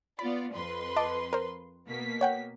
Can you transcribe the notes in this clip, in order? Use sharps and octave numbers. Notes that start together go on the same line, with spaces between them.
B3 F4 D5 B5
F2 B4 C6
D#5 A5 D6
A#4 C5
B2 A#3 B6
C#5 F#5 G5